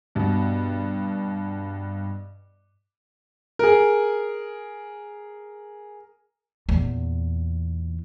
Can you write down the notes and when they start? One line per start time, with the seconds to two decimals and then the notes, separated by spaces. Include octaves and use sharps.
0.15 G2 B2
3.59 G#4 A#4
6.69 E2 A#2